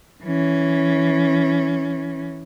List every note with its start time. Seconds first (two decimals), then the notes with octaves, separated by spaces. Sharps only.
0.23 E3 C#4